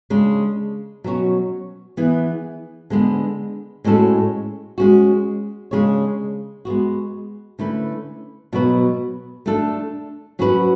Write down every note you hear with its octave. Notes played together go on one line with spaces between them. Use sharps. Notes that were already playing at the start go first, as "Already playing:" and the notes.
C#3 G#3 D4
B2 F#3 C#4 F#4 C#5
E3 B3 E4 G#4
D3 G#3 B3 D4
A2 G#3 C#4 F#4 A4
G#3 C#4 F#4
C#3 G#3 D4 G#4 C#5
G#3 B3 F#4
D3 A3 C#4 E4 B4
B2 F#3 B3 F#4 B4
A3 D4 A4
F#3 C#4 F#4 B4